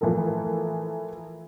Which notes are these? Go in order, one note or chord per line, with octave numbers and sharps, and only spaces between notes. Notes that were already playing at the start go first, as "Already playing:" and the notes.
E3 F3 A3 A4 A#4